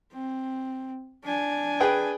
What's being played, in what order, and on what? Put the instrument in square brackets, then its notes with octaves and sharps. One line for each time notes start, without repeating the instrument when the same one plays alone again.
[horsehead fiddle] C4
D4 G#5
[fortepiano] G#4 B4 G5